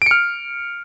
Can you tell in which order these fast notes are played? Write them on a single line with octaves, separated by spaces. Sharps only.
D7 C#7 F6